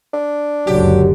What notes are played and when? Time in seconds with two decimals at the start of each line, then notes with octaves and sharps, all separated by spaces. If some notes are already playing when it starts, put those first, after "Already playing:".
0.14 D4
0.67 F#1 C#2 D3 F#3 G4